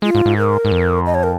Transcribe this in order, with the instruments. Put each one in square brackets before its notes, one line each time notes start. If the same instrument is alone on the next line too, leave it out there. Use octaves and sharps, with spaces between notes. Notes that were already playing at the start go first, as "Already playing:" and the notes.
[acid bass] G#3 [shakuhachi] F4
[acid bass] G#2
G#2
[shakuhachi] A#4
[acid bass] G#2
F2
[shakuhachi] D#5
C#5
A#4